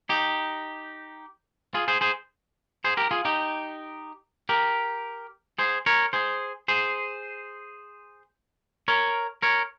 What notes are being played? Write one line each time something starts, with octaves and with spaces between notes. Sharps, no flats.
D#4 G4
F4 G#4
G#4 C5
G#4 C5
G#4 C5
G4 A#4
F4 G#4
D#4 G4
G4 A#4
G#4 C5
A#4 C#5
G#4 C5
G#4 C5
A#4 C#5
A#4 C#5